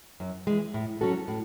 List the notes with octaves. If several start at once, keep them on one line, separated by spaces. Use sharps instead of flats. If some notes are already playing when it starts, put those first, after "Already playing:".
F#2
E3 G#3
A2
F#3 C#4 F#4 A4
A2